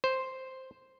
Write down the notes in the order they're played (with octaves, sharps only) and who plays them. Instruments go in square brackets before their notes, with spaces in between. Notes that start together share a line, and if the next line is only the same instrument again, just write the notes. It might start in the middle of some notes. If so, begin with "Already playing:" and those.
[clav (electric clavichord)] C5